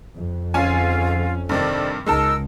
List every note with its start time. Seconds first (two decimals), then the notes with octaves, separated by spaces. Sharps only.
0.14 F2
0.54 G#2 D3 C#4 F4 G#5
1.49 G2 C3 D#3 C4 A4 D5
2.06 C#2 G#3 D#4 A#4 A5 E6